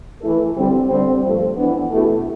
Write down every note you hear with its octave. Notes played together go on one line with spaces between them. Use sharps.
E3 A3 E4 A4
D3 G3 C4
D3 G3 C4
G2 F3 A3
E3 B3 D4
B2 A3 E4 G4